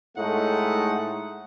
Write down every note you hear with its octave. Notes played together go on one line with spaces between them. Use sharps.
A2 G#3 A3 D#4 F#5